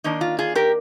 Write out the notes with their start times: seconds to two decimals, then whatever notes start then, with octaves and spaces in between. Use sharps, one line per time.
0.04 D#3 A#3 D4 D#4
0.21 F4
0.39 F4 G#4
0.55 G4 A#4